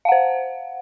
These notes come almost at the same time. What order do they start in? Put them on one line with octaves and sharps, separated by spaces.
F5 F#5 C5